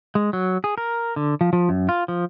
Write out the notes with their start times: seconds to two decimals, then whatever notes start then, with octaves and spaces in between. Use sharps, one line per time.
0.15 G#3
0.33 F#3
0.64 G#4
0.78 A#4
1.16 D3
1.41 F3
1.53 F3
1.69 F#2
1.89 F4
2.08 F3